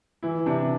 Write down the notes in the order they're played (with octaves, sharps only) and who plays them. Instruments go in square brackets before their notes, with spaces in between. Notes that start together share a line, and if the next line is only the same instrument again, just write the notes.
[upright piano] E3 [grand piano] E4
[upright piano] C3 [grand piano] D4